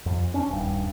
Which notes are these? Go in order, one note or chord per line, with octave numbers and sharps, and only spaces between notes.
F2
C#4 D4
D#1 G2